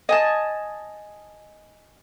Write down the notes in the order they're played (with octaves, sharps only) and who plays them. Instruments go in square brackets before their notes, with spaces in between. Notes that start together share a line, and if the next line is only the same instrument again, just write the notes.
[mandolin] D#5 G#5 A5